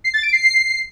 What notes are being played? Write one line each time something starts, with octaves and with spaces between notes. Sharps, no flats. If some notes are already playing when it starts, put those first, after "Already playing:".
C7
A6
D7
C7